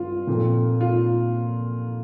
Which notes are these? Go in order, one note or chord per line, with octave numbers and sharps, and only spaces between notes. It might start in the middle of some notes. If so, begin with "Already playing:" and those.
Already playing: G2 C4 F4
A#2 F3 A3 C4
F4